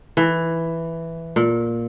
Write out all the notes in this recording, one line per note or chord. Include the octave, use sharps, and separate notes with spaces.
E3
A#2